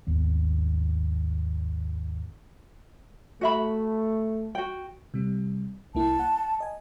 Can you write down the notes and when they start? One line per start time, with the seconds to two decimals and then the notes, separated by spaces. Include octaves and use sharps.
0.07 G#1 D#2 B3
3.41 A3 F#4 E5 B5
4.55 F#4 G5
5.14 C3 G3
5.95 C2 A#3 E4 A5
6.19 F#5
6.60 D#5 G#5